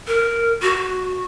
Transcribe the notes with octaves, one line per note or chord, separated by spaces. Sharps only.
A#4
F#4